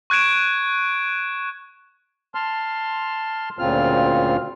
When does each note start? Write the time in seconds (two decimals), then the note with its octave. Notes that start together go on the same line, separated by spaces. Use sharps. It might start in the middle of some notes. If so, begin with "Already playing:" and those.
0.10 C#6 F#6 G#6 D7 E7
2.35 A5 C6 F6
3.59 D2 A#2 C#3 C4 F4 F6